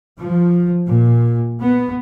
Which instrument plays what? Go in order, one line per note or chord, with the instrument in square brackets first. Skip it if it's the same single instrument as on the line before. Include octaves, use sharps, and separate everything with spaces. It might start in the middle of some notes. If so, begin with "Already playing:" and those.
[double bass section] F3
A#2
B3